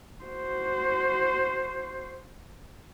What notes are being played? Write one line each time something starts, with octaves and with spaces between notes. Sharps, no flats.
F#4 C5